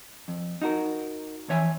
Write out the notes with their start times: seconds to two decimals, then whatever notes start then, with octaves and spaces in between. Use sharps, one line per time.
0.28 F2
0.62 D#4 F#4 A#4
1.48 F2 E3 C#5 E5 G#5